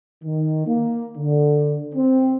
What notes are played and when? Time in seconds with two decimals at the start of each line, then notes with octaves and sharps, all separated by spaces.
0.24 D#3
0.66 A#3
1.17 D3
1.94 C4